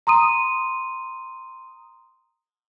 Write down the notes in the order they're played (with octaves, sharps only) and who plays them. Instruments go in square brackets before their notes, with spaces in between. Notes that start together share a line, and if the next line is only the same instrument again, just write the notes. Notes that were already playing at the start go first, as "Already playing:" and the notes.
[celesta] A#5 C6 D#6 D#7